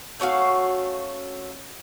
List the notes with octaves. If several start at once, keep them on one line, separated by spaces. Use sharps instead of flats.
A3 C#4 F#4 F5